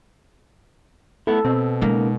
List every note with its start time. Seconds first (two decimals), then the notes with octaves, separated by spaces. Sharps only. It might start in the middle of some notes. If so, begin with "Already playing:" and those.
1.27 A3 B3 E4 A4
1.45 B2 C4
1.81 C#3 G#3 A#3 D#4